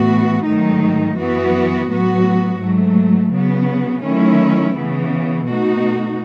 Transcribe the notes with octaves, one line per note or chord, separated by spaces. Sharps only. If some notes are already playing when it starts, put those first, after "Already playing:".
Already playing: A2 E3 B3 F#4
G#2 D#3 F#3 A3 D#4
F#2 E3 B3 F#4
A2 F#3 B3 F#4
G#2 F#3 A3
C#3 F#3 B3
D#3 F#3 A3 C#4 E4
C#3 E3 B3
B2 A3 D#4 F#4